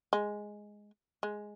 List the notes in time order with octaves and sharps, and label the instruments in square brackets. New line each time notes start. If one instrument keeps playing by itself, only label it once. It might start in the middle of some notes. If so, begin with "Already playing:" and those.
[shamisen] G#3
G#3